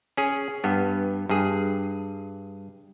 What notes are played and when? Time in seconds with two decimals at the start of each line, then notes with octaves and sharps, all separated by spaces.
0.17 C#4 G#4
0.64 G2 B3
1.29 G2 G#4